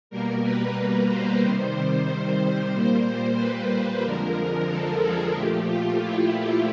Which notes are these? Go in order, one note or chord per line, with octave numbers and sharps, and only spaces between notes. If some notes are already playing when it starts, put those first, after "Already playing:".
B2 G3 A#3 A#4
B4
B4
C5
C3 D#3 G3
C5
A#2 G3 A#3 C5
B4
F2 D3 F3 G#3 A#4
A4
G#4
A#2 F3 A3 G4
F4
E4
E4